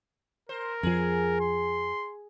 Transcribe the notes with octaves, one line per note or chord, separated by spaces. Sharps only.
A#4 C5
F2 F3 G#4
C6